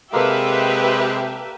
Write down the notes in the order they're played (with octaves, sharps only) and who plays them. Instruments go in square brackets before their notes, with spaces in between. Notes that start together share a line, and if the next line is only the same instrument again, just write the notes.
[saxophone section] C3 G#3 [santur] A#3 A4 D5 [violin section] G4 B4 E5